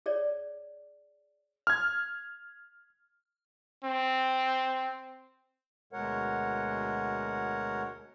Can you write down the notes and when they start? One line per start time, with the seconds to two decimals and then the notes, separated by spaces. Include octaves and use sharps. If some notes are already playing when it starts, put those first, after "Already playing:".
0.06 G#4 C#5 D5
1.67 F6 G#6
3.84 C4
5.93 D2 B2 G#3 A#4 C#5 F#5